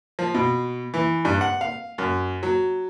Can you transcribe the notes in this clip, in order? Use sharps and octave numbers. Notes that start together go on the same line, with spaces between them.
F3
B2
E3
G2
F#5
F5
F#2
F#3